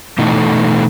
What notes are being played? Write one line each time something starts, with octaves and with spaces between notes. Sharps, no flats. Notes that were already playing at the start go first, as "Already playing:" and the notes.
B2 E3 A3 D#4 A4